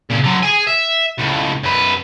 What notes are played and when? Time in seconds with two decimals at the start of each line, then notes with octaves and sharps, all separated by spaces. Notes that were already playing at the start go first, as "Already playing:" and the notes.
0.10 A#2 C#3
0.24 D3 F#3
0.43 G#4 G#5
0.67 E5
1.18 C#2 A2
1.63 F#2 B4